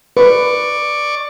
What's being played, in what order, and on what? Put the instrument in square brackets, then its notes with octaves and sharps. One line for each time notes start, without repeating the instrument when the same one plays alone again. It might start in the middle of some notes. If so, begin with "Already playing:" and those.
[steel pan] B4 [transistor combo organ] D5 C#6